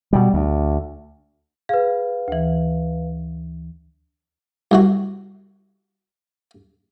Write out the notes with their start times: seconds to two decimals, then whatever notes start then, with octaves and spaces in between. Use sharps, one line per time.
0.13 B2 G3
0.34 D2
1.69 G#4 B4 F5
2.28 D2 E3
4.71 C2 C3 F#4